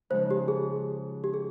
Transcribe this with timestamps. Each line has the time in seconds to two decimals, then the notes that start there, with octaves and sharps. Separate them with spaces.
0.10 C#3 F3 G#3 D#4 C5
0.31 G4
0.48 G#4
1.24 G4
1.34 G#4